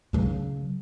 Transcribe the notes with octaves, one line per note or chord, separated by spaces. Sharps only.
C#3 F#3